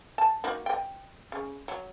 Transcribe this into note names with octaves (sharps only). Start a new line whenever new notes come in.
A5
A#3 D#4 F#4
D#5 G5
C#3
F#3